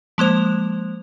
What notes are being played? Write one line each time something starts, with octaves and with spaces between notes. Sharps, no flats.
F3 G#3 A#3 C5 F7